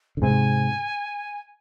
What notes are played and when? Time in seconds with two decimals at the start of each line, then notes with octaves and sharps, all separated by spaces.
0.17 D3
0.22 G#2 C3 G#5